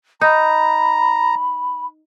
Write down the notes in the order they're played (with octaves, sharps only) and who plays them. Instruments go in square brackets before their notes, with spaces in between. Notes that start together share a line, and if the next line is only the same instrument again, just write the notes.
[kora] D#4 [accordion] A#5 [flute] B5